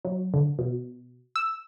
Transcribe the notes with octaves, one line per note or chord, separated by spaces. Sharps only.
F#3
D3
B2
E6